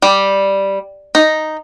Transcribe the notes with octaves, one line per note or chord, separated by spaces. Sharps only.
G3
D#4